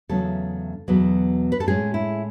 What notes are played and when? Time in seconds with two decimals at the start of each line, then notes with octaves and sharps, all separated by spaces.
0.09 E2 C#3 F#3 A3 C#4 A4
0.88 E2 B2 F#3 B3
1.52 B4
1.60 A4
1.67 A2 G#3 C#4 G#4
1.94 E4